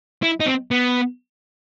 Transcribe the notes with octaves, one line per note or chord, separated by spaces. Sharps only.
E4
D#4
C4
B3